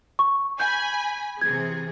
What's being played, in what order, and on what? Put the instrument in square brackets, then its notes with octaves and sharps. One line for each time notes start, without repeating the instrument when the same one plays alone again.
[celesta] C#6
[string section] G#5 B5 [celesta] G6
[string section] C3 E3 G#4 [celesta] G#6